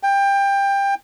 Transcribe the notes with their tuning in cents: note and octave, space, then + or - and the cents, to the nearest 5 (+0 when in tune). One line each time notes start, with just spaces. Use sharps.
G5 +20